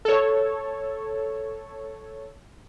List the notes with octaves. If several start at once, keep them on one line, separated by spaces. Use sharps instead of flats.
A4 C#5